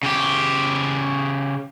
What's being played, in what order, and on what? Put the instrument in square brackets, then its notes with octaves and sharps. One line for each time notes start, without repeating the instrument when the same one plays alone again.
[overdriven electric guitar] C#3 G4